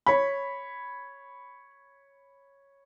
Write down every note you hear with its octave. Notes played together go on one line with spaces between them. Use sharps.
C#5 B5